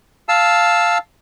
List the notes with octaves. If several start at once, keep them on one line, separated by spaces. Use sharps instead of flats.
F5 A5 E6